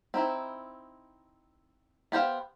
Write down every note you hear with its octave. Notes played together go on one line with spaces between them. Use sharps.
C4 D#4 E4
B3 G4 C5 F5